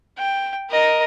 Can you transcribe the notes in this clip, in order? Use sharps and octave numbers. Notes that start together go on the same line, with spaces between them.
G5
A#4 D#5